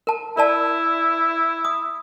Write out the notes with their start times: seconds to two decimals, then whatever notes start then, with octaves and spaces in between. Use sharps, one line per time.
0.07 A#4 A5
0.37 E4 A#4 D5 A5
1.65 D#6